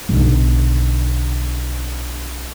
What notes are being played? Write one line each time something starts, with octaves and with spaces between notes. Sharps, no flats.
B1 D3